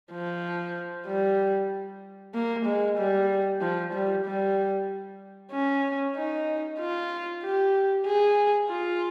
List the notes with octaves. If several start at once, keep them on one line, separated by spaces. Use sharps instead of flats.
F3
G3
A#3
G#3
G3
F3
G3
G3
C#4
D#4
F4
G4
G#4
F4